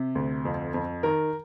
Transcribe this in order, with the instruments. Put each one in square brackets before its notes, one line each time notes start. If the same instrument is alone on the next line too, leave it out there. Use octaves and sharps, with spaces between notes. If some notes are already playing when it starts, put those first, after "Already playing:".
Already playing: [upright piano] C3
D2
F2
F2
D#3 A#4